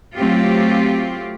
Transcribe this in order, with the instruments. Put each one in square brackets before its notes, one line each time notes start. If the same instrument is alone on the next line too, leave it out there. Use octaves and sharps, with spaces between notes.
[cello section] F#3 A3 C4 F4 G4